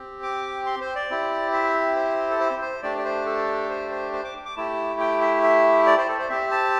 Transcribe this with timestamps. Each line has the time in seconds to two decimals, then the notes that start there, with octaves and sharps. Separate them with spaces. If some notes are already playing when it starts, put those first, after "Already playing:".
Already playing: C4 G4
0.23 D6
0.66 C6
0.81 C5
0.95 D5
1.10 C4 E4 G4
1.53 E5
1.96 C5
2.30 A4
2.40 C5
2.61 C5
2.83 A3 D4 G4 D5
2.98 D5
3.05 C5
3.26 A4
3.70 C5
3.91 C5
4.13 C5
4.24 D6
4.45 D6
4.57 A3 E4 G4 A5
5.00 G5
5.21 E5
5.43 E5
5.86 D5
5.98 C5
6.08 A4
6.19 C5
6.29 C4 G4 E5
6.51 A5